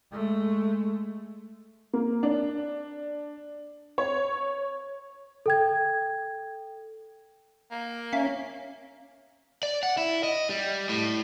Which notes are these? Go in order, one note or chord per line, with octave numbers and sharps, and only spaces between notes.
G#3 A3
A#3
D4
C#5
A4 G5 G#6
A#3
C#4 E5 F5 B6
D5
F#5
E4
D#5
G3
A2